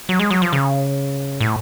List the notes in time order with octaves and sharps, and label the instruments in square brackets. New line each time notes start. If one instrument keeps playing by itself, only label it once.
[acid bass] F#3
G#3
F#3
F3
C#3
A2